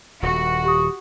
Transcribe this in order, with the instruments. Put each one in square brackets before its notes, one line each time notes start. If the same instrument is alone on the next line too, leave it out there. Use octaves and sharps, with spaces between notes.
[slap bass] D#1 [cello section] F#4
[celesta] G4 C#6 D#6